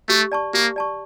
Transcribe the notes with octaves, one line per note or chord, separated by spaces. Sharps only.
A3 G4
D5 A5 C#6
A#3 G4
D5 A5 C#6